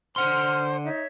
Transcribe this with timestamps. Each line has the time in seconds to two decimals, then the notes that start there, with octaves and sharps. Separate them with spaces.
0.16 D3 C5 F#5 C6 F6
0.85 D#4 C#5 E5